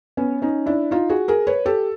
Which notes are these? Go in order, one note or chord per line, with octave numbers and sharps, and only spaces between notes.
B3 C#4
C#4 D#4
D4 E4
D#4 F4
F#4 G#4
G#4 A#4
B4 C#5
G4 A4